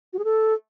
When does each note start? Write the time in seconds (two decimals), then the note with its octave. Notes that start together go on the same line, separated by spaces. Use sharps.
0.13 F#4
0.19 G#4
0.24 A4